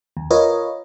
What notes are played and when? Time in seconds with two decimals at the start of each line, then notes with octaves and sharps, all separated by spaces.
0.17 D#2
0.31 F4 A#4 B4 C#5 D#5